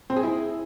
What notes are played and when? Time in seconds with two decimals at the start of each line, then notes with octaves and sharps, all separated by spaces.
0.10 C4
0.16 G#4
0.23 E4